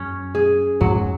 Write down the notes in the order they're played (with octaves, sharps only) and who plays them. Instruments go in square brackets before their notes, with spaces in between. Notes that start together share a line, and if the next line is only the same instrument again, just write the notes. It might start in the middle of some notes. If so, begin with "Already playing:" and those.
Already playing: [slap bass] F#2 [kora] C#4
[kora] G#4
[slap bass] F2 G#2 [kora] F#3